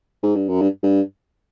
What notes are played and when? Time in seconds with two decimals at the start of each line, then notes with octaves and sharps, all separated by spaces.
0.23 G#2
0.35 G2
0.49 F#2
0.61 G2
0.83 G2